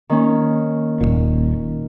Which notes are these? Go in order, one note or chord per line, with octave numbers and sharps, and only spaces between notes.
D#3 A#3 C#4
D#1 G#1 A#2